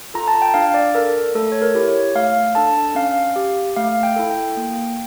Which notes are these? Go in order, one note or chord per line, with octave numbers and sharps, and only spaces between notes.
F4 A4 A#5
A5
G5
D4 F5
D5
A4 A#4
A3 A4
C#5
A#4
E4 G4
C#5
A3 F5
D4 A4 A5
C#4 F5
G4
A3 F5
G5
E4 A4
G5
A#3